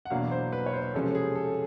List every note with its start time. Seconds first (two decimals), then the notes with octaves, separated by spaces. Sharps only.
0.05 F#5
0.10 E2 B2 F#3 A#3 D4 F5
0.31 C5
0.53 B4
0.66 C#5
0.73 C5
0.94 C3 F3 G#3 C#4 A4
1.15 G#4
1.35 A4